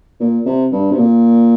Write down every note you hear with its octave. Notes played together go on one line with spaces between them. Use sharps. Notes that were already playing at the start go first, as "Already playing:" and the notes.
A#2
C3
G2
C3
A#2